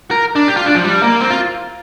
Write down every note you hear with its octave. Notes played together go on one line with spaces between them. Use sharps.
A#4
D4
G4
F4
D4
F3
G3
A#3
C4
F4